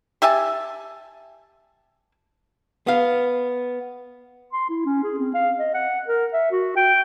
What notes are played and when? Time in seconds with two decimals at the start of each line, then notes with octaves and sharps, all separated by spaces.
0.22 G4 E5 G#5 A5
2.87 B3 F5
4.53 C6
4.69 E4
4.86 C#4
5.04 G#4
5.19 C4
5.34 F5
5.59 D#5
5.74 F#5
6.08 A#4
6.33 E5
6.52 F#4
6.77 G5